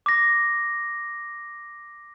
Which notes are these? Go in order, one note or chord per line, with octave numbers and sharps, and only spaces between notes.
D6 A#6